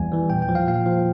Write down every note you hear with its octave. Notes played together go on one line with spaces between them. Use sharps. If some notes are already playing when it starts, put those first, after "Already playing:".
Already playing: E2 E3 G3 G#5
E3 G3
A#2 G5
G5
F3
F5
A#2 F5
F3